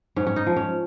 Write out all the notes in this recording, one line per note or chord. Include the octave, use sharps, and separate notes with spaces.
G#2 C#4
C#4
D#4
F3
C#4